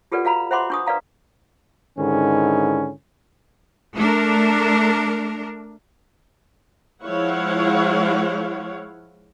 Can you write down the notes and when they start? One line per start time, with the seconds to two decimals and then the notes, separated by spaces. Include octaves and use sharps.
0.12 F4 G4 A4 B4 D5 F#5
0.25 F#4 F5 A#5 B5
0.51 C5 E5 F#5 B5 C6 D6
0.70 D4 C#6 D#6
0.87 B4 D5 F5 A#5
1.98 G#2 D3 D#3 C#4 E4
3.96 A3 D4 A#4
7.04 F3 G#3 E4 C#5 F5 F#5